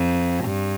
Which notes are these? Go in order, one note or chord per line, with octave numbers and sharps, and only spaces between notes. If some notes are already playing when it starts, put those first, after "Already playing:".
Already playing: F2
G2